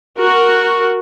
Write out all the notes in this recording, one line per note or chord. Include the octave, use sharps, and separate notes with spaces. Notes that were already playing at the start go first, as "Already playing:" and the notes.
F#4 A#4